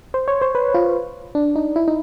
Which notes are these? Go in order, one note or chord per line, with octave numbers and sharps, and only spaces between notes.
C5
C#5
C5
B4
F4
D4
D#4
E4
D#4